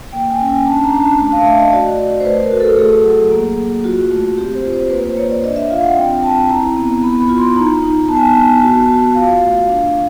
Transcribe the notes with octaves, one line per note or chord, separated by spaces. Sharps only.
A#3 G5
G#5
C#4
G#5
D4 A5
A#5
D4
A5
A3 A5
F5
A3 E5
D#5
F#4 D5
D#5
D5
F#4
C5
A3 B4
A#4
F#4
A4
A4
A3 G#4
F#3
A#3
A#3
F4 F#4
A3
C4 G4
C5
F4
C5
A#3 B4
C5
A#3 C#5
D5
D4 D#5
E5
F4 F5
F#5
C4 G5
C4 A5
E4 A#5
B3
B3 B5
B5
F4
C6
D#4 A#5
D#4
B3 A5
G#5
A5
B3
F#4
F#4
F4 F5
A3
D4